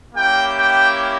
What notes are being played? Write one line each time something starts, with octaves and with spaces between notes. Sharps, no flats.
A#3 C#4 E4 G4 G5
G5